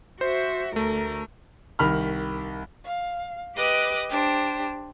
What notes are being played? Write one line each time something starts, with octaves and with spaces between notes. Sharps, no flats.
F#4 C5 E5
D2 A3 A#4
C2 D#3 B5 F6
F5
G4 B4 D#5 D6 F#6
D4 G4 C5